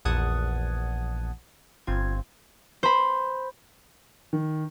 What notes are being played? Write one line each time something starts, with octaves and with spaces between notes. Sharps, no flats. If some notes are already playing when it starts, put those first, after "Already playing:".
A#1 E2 F#5 A5 D#6 G#6
G1 C4 F4 G#6
C5 B5
D#3